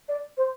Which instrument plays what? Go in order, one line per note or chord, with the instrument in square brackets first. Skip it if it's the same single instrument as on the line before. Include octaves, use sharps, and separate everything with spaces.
[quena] D5
C5